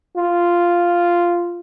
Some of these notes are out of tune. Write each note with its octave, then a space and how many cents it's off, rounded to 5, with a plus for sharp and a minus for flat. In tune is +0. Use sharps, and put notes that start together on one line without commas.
F4 -5